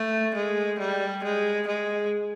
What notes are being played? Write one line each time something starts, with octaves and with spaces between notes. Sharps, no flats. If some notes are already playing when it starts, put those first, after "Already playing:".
Already playing: A3
G#3
G3
G#3
G#3